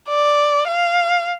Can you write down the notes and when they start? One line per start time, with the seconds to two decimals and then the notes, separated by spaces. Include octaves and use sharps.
0.09 D5
0.68 F5